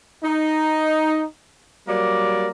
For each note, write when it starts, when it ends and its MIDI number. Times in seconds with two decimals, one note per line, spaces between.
0.23 1.23 63
1.87 2.49 54
1.87 2.49 55
1.87 2.49 58
1.87 2.49 70
1.87 2.49 74